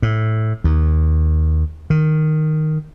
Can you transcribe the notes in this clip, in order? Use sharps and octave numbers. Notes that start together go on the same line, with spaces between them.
A2
D#2
D#3